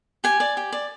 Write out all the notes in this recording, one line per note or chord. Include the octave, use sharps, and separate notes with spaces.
G4 G#5
D5
G4
D5